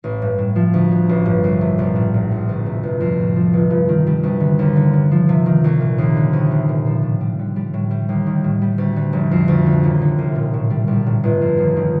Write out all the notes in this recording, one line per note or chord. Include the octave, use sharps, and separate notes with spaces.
A1
G2
A2
F3
D2
D3
A1
G2
C2
C3
A#1
A2
F1
F2
D2
C3
G1
F2
A2
F3
G1
G2
D#3
G3
D2
D3
D#2
D3
D3
F3
C3
D#3
C2
A#2
D#2
D3
D2
C3
A#2
F3
A2
G3
D3
G3
A2
G3
D#2
D#3
A2
G3
D2
D3
F1
F2
D2
D3
D#2
D3
C2
A#2
A2
G3
A#1
A2
G1
F2
D#2
D#3